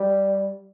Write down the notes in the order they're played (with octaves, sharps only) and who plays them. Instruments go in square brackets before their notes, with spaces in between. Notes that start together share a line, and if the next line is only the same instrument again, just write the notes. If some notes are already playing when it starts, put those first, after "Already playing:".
Already playing: [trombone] G3